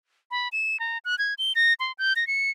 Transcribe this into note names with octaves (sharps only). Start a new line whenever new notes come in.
B5
E7
A#5
F#6
G#6
G7
A#6
C6
G6
A#6
C#7